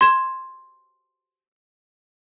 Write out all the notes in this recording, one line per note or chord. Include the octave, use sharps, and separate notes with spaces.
C6 G#6 E7